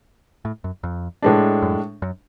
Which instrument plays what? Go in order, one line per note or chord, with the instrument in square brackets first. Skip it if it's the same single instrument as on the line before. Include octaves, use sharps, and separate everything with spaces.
[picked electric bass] A2
F#2
F2
[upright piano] A2 G#3 D4
[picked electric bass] F#2
F#2